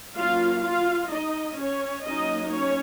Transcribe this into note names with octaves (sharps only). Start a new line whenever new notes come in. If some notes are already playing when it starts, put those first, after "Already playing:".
F#3 A#3 C#4 F4 F5
F4 F5
D#4 D#5
C#4 C#5
F#3 A#3 C#4 D#4 D#5
C#4 C#5